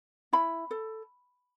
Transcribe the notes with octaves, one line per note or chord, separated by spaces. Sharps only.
E4 B5
A4